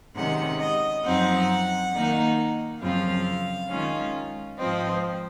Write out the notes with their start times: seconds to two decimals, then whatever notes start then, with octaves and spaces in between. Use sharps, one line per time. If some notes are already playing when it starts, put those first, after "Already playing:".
0.15 C3 D#3 G#3 C#4 F#5
0.59 D#5
1.04 F#2 F3 C4 D#4 F#5
1.92 D#3 A#3 D#4
2.81 F#2 C#3 F3 C4 F4 F5
3.69 D#3 G#3 C#4 F4
4.58 G#2 F3 C4 D#5